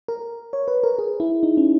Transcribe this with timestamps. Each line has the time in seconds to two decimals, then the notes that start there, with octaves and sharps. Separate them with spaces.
0.08 A#4
0.53 C#5
0.68 B4
0.83 A#4
0.99 G#4
1.20 E4
1.43 D#4
1.57 C#4